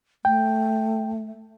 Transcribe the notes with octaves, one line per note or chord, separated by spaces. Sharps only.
A3 G5